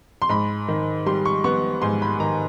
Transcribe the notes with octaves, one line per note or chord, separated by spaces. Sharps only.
C6
G#2 B5
D#3
G3 C6
C#6
B3 C#6
G#2 C6
B5
D#3 A#5